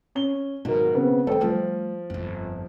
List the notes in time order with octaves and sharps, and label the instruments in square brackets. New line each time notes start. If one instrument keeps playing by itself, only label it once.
[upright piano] C#4 G7
[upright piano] G#1 F#3 A#4 [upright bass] B2
[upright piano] C#3 B3 C4
[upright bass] G#3 A3 [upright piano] A4 C5 G5
[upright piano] F3 [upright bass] G3 A3
[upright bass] G1 F2